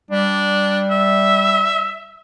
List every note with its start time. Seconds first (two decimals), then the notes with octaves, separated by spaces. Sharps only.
0.11 G3 D4
0.90 E5